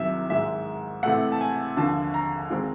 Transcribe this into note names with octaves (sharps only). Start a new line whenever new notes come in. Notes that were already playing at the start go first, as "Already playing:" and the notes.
Already playing: C2 C3 D#3 F#3 E5
G#2 D#3 G#3 E5
C3 E3 A3 F#5
A5
G#5
D#2 D3 F3 A5
A#5
D#3 G#3 C4